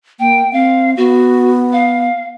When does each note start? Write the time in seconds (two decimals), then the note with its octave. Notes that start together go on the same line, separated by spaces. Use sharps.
0.20 A#3 G5
0.53 C4 F5
0.97 B3 F#4
1.73 F5